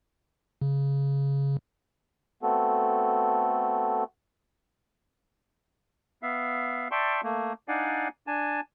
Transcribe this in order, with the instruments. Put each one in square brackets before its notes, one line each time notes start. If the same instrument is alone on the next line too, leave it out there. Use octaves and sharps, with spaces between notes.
[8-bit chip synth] C#3
[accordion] A3 B3 C4 F#4 A4
[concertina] B3 E5 F5
D5 E5 G5 A5 C6 C#6
A3 A#3
D4 D#4 D5 F5 F#5 G#5
D4 G#5 A5